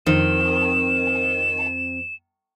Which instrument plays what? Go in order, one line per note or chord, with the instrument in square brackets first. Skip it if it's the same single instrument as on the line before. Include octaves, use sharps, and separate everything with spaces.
[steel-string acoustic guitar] F2 C4 [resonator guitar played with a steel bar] D#3 [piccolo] E7